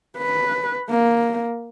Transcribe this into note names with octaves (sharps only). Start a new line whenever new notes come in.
B4
A#3